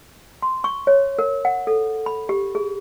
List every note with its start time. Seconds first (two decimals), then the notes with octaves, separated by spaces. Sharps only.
0.42 C6
0.64 C#6
0.87 C#5
1.19 A#4
1.45 F#5
1.67 A4
2.06 B5
2.29 G4
2.55 G#4